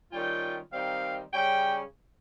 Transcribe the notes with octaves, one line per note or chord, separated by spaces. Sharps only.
D#3 G3 C#4 F4 G5
D#3 G3 C4 D#4 F5
C#3 G3 C#4 G5